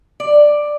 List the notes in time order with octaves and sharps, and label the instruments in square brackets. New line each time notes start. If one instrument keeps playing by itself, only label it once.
[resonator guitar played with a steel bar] D5